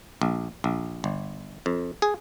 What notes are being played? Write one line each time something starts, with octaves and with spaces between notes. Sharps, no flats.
A#1
A#1
G1
F2
G#4